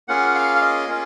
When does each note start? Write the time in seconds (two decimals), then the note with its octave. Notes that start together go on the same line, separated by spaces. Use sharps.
0.08 A#3 C#4 F4 G#4 F#5
0.35 F5
0.56 F5
0.62 D#5
0.89 A#3 C#4 F4 G#4